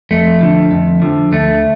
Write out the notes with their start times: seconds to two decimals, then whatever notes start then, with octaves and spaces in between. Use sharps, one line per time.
0.11 F2 A3
0.41 D3 F3
0.71 F2
1.02 D3 F3
1.32 D2 A3